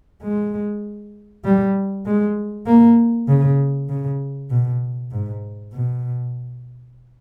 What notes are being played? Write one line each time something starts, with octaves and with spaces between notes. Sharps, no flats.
G#3
G3
G#3
A#3
C#3
C#3
B2
G#2
B2